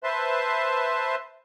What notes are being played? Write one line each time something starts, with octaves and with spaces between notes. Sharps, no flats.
B4 C5 E5 A5 C6